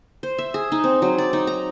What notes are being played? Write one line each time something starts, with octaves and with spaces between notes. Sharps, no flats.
C5
E5
G#4
D#4
C4
F#3
D5
D#4
A#5